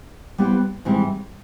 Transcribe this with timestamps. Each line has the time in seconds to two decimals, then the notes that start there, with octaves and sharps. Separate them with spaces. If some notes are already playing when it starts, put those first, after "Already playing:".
0.38 G3 B3 E4 G4 C5
0.85 G#2 E3 G3 C4